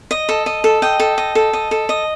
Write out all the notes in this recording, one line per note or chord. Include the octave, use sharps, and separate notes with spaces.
D#5
A4
D#5
A4
D#5 G5
A4
D#5
A4
D#5
A4
D#5